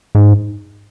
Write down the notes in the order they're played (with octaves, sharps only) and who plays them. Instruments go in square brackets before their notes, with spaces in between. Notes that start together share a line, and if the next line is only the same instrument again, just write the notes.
[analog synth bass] G#2